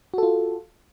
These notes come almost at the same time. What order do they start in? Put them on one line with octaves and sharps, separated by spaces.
F#4 A4 F4